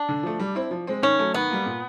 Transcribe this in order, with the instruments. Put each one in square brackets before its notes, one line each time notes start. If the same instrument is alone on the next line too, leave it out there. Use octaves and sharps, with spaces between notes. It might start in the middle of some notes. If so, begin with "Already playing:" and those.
Already playing: [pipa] D4
[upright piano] D3
F3 A3
G3
C4 E4
F3
G#3 C4
[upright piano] D#3 [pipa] C#4
[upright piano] F#3 A3
[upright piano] D#3 [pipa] B3
[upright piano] G3 A#3
A#2